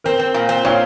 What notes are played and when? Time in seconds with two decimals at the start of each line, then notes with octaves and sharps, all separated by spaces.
0.04 C4 A#4
0.19 C4
0.34 A#2
0.49 C4
0.65 A#2 C#5 F5